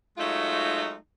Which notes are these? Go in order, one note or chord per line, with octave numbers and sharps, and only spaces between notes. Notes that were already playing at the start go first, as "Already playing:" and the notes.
F#3 G#3 A3 D#4 F4